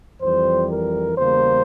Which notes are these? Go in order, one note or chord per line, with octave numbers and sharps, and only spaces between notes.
F2 E3 G3 C5
A#4
E2 C#3 G3 A#3 C5